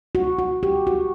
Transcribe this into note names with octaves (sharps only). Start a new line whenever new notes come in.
F#4
F#4
G4
F#4